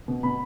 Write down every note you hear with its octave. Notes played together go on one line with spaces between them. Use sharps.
B2
B2 B5